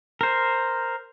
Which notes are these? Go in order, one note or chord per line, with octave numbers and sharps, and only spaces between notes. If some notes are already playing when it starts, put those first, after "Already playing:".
A#4 C5